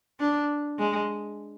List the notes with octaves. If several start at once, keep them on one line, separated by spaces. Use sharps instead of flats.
D4
G#3